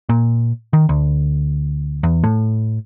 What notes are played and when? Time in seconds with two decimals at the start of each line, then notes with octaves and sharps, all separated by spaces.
0.09 A#2
0.73 D#3
0.89 D2
2.03 E2
2.23 A2